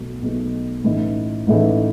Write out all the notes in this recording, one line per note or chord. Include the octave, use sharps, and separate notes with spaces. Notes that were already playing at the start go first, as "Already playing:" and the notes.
Already playing: B1 B2 F#3 A3
B1 B2 F#3 A3
A1 A2 E3 A3 D#4
A1 A2 E3 A3 D#4